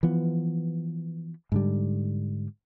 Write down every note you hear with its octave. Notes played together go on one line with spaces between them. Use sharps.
E3 F3 B3
G#2 D3 G3